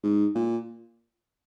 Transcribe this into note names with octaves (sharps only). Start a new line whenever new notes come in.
G#2
A#2